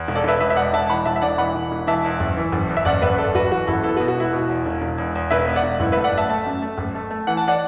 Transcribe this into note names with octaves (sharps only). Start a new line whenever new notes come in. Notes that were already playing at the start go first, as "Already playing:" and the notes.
Already playing: E2
E1
A4 D5
E1 B4 E5
E1 B4 E5
E5
E2 D5 F#5
E1 E5 A5
E3 F#5 B5
E1 E5 A5
E5
E1 D5 F#5
E3 F#5 B5
E1
E1
E3 E5 A5
E2
F#1
E3
F#1
E2
E5
F#1 D5 F#5
F#1 B4 E5
F#1 A4 D5
F#1 F#4 B4
E3 F#4
F#1 E4 A4
B3 E4 A4
B2 F#4 B4
F#4
E1 E4
B2
E2
E1
E1
E2
E2
E1 B4 E5
B3
D5 F#5
E1
F#1 E4
A3 B4 E5
D5 F#5
F#1
E5 A5
A3 E5 A5
F#2
A3
F#1
A3
A3
E3 F#5
A5
D5 F#5